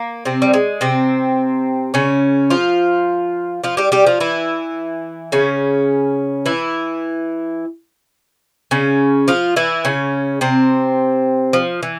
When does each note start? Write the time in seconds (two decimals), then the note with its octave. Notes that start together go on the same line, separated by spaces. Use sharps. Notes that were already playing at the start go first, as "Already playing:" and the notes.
Already playing: A#3
0.25 C3 C4
0.42 G3
0.53 G#3
0.81 C3 C4
1.94 C#3 C#4
2.50 F3 F4
3.64 F3 F4
3.77 G3 G4
3.92 G3 G4
4.06 F3 F4
4.20 E3 E4
5.32 C#3 C#4
6.46 E3 E4
8.71 C#3 C#4
9.28 F3 F4
9.56 E3 E4
9.85 C#3 C#4
10.41 C3 C4
11.53 F3
11.83 E3